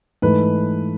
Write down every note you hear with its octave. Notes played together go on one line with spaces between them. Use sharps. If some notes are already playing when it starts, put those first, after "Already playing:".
G#2 E3 A3 B4